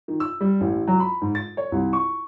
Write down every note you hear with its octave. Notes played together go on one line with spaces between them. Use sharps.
D#3
E6
G3
A1
F#3
B5
G#2
A6
C#5
C2
C#6